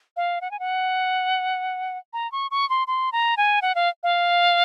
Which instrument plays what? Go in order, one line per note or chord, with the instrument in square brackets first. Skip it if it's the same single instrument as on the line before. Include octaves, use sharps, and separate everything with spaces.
[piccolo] F5
F#5
G#5
F#5
A#5
C#6
C#6
C6
C6
A#5
G#5
F#5
F5
F5